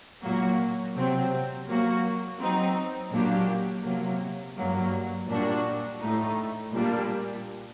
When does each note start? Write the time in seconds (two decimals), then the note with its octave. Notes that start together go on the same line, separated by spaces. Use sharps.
0.23 A#2 F#3 A#3 F#4
0.96 C3 F#3 C4
1.68 F#3 A#3 F#4
2.40 F#3 C4 D#4
3.12 A#2 F#3 A#3 D4 G4
3.84 C3 F#3 A#3
4.56 G2 F#3 A#3
5.28 A#2 G3 D4 F#4
6.01 A2 A3 D#4
6.73 A#2 G3 A#3 D4